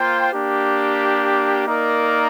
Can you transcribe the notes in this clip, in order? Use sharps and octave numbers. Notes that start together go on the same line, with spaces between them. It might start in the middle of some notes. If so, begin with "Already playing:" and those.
Already playing: A#3 F4 C5 G5
A#3 D4 G4
A#3 D#4 A#4 D5